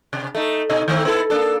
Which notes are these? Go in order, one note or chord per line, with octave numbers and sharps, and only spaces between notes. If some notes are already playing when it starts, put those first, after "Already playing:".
C3
A3 D#4
B2 D#4 D#5
D#3 A3 C4
B3 E4 A4
A#3 D4 A4